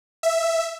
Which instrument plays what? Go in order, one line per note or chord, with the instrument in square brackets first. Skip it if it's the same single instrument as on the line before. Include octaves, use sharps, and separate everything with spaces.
[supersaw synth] E5